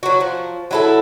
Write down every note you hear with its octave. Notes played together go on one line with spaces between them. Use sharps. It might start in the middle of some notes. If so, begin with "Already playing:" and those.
F#3 F#4
F3
F#3 E4 A4